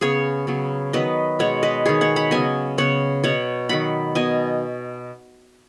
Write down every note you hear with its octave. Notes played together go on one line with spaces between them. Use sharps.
C#3 B3 G#4 C#5
C#3 F#3 B3
D#3 F#3 B3 B4 D#5
B2 G#3 B3 C#5 F#5
B4 D#5
D#3 B3 G#4 C#5
C#5 F#5
F#5 B5
C#3 F#3 B3 D#5 G#5
C#3 B3 C#5 F#5
B2 B3 C#5 F#5
D#3 F#3 B3 F#5 B5
B2 B3 D#5 G#5